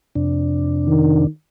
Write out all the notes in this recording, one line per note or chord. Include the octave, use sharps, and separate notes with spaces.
F2 C3 D4
D#3